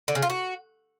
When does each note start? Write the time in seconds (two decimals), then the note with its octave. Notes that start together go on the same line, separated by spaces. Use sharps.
0.08 D3
0.15 C#3
0.22 F4
0.30 F#4